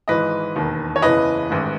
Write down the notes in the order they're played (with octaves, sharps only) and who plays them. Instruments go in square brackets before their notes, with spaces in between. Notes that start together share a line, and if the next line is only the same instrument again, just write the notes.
[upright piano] G#1 G#2 E3 B4 D#5
E1 D#2 D#3
C#5
F#1 E2 C#3 E3 B4 D#5
A1 G#2 D#3